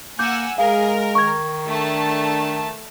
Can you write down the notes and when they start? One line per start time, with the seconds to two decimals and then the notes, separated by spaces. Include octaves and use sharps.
0.19 A#3 F#5 G#5 D6 E6 G6
0.58 G#3 G#4 A#4 F5
1.15 D#3 C#6 G#6
1.68 A3 D4 A5